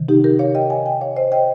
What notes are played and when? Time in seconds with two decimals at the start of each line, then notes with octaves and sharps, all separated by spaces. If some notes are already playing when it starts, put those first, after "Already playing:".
Already playing: C3 D#3
0.09 D#4 G4
0.24 G4 A#4
0.39 C#5 F5
0.55 D#5 G5
0.70 F5 G#5
0.86 D#5 G5
1.01 C#5 F5
1.16 C5 D#5
1.32 D#5 G5